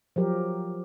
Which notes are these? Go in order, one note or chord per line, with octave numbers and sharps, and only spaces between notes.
F3 F#3 G4 A#4